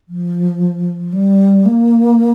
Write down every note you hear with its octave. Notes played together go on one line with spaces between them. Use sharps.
F3
G3
A#3